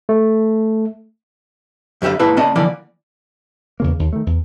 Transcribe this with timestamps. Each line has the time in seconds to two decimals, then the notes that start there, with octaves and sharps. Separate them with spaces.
0.09 A3
2.02 F#2 D3 G4 E5 F5
2.19 G#2 A#3 E4 B4 F5 A5
2.37 C#3 A#3 C#4 D5 D#5 A5
2.56 D3 E3 F3 A#3 D5
3.80 E2 C#3 A#3
3.99 D#2
4.13 D#3 A3
4.26 E2